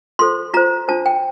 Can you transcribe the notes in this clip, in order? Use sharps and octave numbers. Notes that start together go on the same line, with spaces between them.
F4 A4 C5 C6
F4 C5 A#5
D4 F4 C5 A5
G5